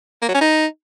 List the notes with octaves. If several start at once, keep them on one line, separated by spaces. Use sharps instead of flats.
A#3
F#3
C#4
D#4